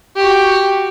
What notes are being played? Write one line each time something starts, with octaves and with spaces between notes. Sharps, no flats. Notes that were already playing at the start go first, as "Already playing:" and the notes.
F#4 G4